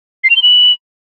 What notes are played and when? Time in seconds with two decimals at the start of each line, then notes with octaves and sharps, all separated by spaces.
0.24 C7
0.30 F7
0.36 G7
0.42 F#7